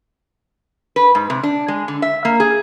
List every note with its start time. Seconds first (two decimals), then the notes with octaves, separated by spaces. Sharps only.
0.96 B4
1.15 G#2
1.30 C3
1.43 D4
1.68 G#3
1.88 D3
2.02 E5
2.25 A#3
2.40 G#4